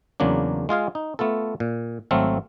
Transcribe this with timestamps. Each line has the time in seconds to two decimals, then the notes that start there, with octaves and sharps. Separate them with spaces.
0.20 E2 C#3 F#3 A#3 D4
0.69 G#3 F4 G#4 F5
0.95 D#4
1.19 A3 B3 F4 A4
1.60 A#2
2.11 G#1 F#3 A3 C4 A4 F5